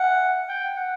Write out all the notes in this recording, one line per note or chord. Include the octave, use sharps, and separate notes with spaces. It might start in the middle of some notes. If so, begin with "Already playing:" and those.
Already playing: F#5
G5
F#5